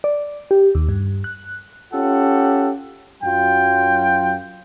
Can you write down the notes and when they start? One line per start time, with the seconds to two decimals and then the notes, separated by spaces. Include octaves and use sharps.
0.04 D5
0.51 G4
0.75 D#2
0.89 G2
1.24 F#6
1.93 C#4 F4 G4 A4 F#5
3.23 F#2 F#3 F4 G5